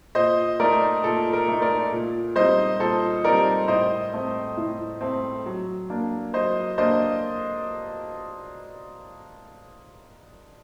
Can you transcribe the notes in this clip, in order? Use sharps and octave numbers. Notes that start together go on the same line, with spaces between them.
A#2 C5 D#5
A3 D#4 A#4 D5
A#2 A4
A#4
A3 D#4
A#4 D5
A#2
G3 C4 D#4 C5 D#5
A#2 A4 C5
G3 C4 D#4 A#4 D5
A2 C5 D#5
A3 C4
A2
A3 C4
F#3
A#3 D4
F#3 C5 D#5
A#3 D4 C5 D#5